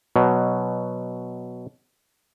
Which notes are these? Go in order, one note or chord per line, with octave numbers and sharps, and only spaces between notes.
B2 F#3